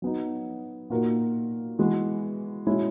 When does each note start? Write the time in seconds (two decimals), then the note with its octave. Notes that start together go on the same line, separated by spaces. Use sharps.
0.02 F#3 B3 D#4
0.90 A#2 A#3 D#4 F#4 A#4
1.79 E3 G#3 B3 F#4
2.66 B2 G#3 C#4 E4